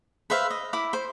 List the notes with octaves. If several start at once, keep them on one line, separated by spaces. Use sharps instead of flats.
B4 C5 E5 F5
D#5
E4 B5 D6
C5